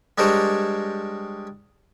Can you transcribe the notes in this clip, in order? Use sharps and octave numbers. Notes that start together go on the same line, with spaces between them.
G3 G#3 D4 A#4 C5 C#5